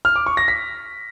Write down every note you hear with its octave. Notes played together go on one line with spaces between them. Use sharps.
F6
D6
C#6
A#6
B6